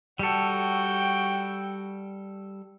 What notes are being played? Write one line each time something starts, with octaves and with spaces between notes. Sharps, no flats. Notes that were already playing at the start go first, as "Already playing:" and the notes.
G3 F#4 A4 G5